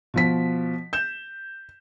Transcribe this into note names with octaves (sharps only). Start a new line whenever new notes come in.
B2 F3 B6
G6 E7